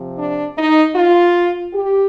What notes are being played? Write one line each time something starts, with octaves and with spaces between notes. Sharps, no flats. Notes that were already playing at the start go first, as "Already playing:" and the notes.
Already playing: C3 F3
D4
D#4
F4
G4